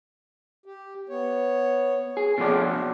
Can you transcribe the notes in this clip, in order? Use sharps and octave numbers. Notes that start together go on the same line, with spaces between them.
G4
B3 C#5
G#4
B2 F3 C#4 A4 C#5 D5
F#4